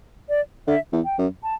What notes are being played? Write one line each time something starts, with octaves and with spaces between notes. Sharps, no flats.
D5
D3 E5
E2
G5
F#2
A5